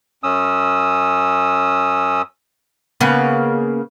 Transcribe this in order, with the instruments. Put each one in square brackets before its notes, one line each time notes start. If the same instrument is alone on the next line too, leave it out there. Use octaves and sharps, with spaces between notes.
[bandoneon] F#2 C#4 D#6 E6
[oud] C#3 A#3 B3